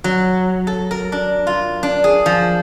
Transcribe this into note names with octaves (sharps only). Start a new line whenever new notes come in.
F#3
A4
A#4
D4
F4
D4
G#4
F3